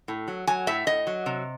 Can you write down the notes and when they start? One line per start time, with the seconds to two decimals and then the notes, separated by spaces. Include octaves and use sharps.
0.08 A2
0.28 F#3
0.47 F#3 G#5
0.67 A2 E5
0.86 A2 D#5
1.07 F#3
1.26 C3